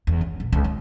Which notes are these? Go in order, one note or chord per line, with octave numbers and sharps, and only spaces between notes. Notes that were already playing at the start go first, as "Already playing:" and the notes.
E2
C#2
A#1
C#2
F4